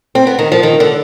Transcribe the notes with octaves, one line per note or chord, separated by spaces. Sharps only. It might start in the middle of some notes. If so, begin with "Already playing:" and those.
C4
B3
D#3
F3
D#3
D3